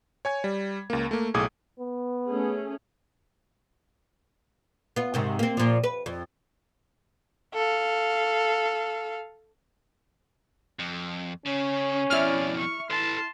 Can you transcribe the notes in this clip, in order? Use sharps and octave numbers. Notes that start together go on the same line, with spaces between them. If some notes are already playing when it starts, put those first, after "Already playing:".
C#5 G#5 G#6
G3
C#2 A#3
A3 A#3
B1 A2 G#4 D6 D#6 G#6
B3
A3 C#4 G#4
B3 F4
G#2 C3 D#3
A#3 C4
A#2 F3
B4
F2
A4 F5
F2
C#3 C#4
F2 B2 E4 D5 F6
C#6
A4 B4 A5 C6